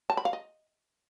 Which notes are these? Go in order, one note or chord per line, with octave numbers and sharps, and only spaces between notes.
A5
B5
F5
D#5